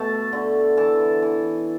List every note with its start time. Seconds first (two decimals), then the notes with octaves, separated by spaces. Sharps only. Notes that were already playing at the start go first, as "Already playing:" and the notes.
Already playing: B2 A3 A5
0.33 D3
0.77 E3 A5
1.22 E3